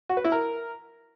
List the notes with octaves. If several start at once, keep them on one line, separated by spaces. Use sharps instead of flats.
F#4
B4
E4
A#4